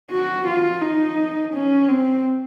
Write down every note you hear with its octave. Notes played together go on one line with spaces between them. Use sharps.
F#4
F4
D#4
C#4
C4